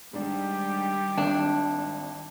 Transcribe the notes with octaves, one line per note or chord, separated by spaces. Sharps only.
G#2 D#3 G3 D4 G4
G#1 D4